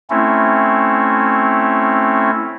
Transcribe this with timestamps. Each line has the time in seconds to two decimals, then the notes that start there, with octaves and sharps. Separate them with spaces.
0.10 A3 C4 C#4 E4